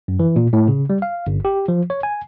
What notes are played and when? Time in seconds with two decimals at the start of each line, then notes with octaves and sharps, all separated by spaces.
0.08 F#2
0.20 E3
0.36 A#2
0.53 A2
0.68 C#3
0.90 G3
1.02 F5
1.27 G1
1.45 G4
1.68 F3
1.90 C#5
2.03 G#5